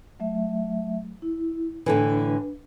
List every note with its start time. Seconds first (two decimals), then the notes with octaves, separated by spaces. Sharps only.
0.20 F#3 A3 E5
1.22 E4
1.86 A2 D3 E3 D4 B4